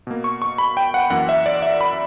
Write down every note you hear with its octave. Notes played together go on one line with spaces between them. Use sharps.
B2 A#3
C#6
C#6
B5
G5
F#5
F#2 E3 A#3 F#5
E5
D5
E5
B5